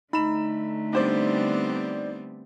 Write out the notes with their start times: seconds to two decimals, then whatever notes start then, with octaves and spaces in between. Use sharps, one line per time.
0.13 D3 A3 D#4 B5 E7
0.93 G3 B3 C4 D4 C5 D5